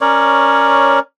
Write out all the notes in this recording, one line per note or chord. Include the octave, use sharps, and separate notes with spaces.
C#4 A#4 C#5 D5